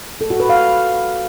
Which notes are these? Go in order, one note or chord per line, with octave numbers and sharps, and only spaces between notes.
A4
F#4
B4
F5